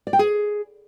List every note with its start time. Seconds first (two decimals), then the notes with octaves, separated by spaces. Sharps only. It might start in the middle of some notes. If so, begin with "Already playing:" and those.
0.07 D5
0.13 G5
0.19 G#4